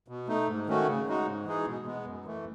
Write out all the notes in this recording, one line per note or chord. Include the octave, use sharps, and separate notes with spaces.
B2
A3 D#4
G#2
D#3 A3 C#4 F#4
C#3
G#3 D#4 F#4
G#2
E3 G#3 D#4 G#4
B2
G#3 B3
F#2
E3 A3